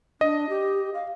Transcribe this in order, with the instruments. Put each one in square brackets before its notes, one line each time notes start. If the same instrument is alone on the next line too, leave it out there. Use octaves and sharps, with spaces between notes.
[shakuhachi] D4 [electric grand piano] D#5
[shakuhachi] G4
F5